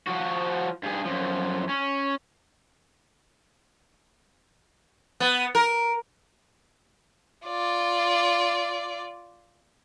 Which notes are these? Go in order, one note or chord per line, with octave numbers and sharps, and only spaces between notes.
F3 F#4
G2 G#4
F#2 F3
C#4
B3
A#4
F4 D5